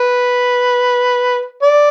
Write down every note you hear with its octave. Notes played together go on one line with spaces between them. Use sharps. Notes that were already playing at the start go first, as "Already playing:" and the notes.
Already playing: B4
D5